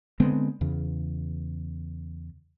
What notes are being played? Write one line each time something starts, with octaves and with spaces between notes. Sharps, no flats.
D3 G#3 B3 C4
E2 C#3